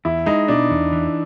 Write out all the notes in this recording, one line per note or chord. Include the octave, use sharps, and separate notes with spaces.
E2 E4
G#3 D#4
B2 D4
E2
E3